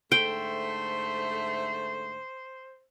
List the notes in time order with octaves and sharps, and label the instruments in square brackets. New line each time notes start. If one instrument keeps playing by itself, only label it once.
[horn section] G#2 D3 A3 [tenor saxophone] C5 [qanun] G5